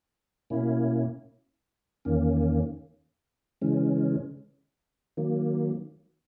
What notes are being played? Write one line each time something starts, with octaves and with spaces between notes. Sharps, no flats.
B2 A#3 C#4 E4
E2 D#3 A#3 C#4
C#3 E3 G#3 C#4
D#3 F#3 A#3